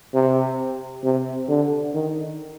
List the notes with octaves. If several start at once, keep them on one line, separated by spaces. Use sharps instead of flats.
C3
C3
D3
D#3